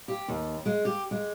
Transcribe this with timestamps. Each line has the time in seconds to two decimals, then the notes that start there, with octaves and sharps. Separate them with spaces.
0.08 G4
0.28 D#2
0.66 G#3
0.85 G4
1.11 G#3